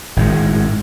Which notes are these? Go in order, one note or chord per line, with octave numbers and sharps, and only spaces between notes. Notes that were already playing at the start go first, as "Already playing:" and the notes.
G#1 A2 G#3